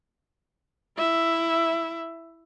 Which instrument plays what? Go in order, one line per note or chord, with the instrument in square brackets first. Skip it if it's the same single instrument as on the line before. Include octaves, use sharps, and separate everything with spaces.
[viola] E4 E5